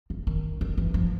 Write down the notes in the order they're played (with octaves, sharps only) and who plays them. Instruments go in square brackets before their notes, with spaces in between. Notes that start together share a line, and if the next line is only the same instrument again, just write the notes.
[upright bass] D#3
D#3
D#3
E3
F3